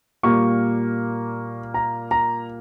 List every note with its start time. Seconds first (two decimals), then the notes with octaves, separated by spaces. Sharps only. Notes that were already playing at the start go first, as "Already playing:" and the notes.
0.23 A#2 G3 A#3 C#6
1.74 A#5
2.11 A#5